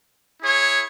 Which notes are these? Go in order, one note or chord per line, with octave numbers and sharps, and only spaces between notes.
E4 G#4 C#5